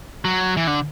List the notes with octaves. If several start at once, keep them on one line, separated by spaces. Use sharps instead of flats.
F#3
E3
D3